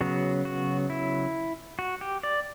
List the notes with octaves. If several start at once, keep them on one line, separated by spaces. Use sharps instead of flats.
C#3 F#3 B3 F#4
F#4
E4
F#4
G4
D5